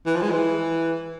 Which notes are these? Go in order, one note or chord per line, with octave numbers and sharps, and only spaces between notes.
E3
F3
G#3
E3